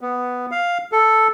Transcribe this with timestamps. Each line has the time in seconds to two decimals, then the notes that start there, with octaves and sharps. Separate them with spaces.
0.01 B3
0.51 F5
0.92 A4